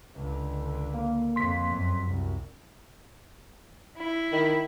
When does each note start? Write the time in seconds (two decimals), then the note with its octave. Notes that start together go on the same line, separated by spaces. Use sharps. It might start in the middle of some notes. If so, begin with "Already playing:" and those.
0.15 C#2 D3
0.94 A#3
1.36 F2 C6 B6
1.72 F#2
2.07 C2
3.97 E4
4.32 D#3